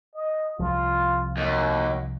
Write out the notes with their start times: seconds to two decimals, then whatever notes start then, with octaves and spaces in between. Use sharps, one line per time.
0.15 D#5
0.59 C2 F3 F4
1.37 D#2 F#4